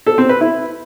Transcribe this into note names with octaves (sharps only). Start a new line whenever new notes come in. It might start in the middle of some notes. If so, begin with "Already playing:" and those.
A4
C4
B4
E4